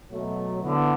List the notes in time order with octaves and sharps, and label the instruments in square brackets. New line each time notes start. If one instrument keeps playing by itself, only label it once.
[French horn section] B2 F#3 A3
[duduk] D3 [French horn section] E3 B3 E4